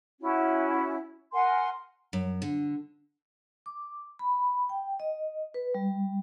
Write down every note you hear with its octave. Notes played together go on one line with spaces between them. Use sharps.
C#4 E4 F#4
A#4 F#5 G#5 C6
F#2
D3
D6
B5
G5
D#5
B4
G3